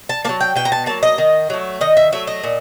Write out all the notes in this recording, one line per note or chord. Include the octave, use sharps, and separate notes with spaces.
A5
F#3 A#3 A5
G5
B2 G5
A#5
A5
F#3 A#3 A5
D#5
D#3
F#3 A3
D#3 D#5
E5
F#3 A3 E5
D#5
A#2